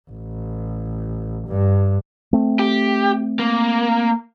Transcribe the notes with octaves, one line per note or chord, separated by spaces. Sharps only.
A1
G2
A3 C4
G4
A#3